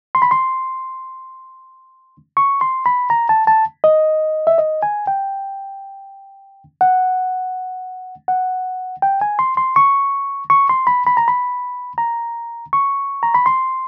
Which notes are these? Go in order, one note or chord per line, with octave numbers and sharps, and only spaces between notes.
C6
B5
C6
C#6
C6
B5
A#5
A5
A5
D#5
E5
D#5
G#5
G5
F#5
F#5
G5
G#5
C6
C6
C#6
C#6
C6
B5
B5
A#5
B5
A#5
C#6
A#5
B5
C6